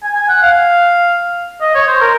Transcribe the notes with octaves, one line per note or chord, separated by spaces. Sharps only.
G#5
G#5
F#5
F5
D#5
C#5
C5
A#4